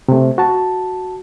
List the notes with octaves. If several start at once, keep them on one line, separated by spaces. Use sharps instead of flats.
C3 A3
F#4 A5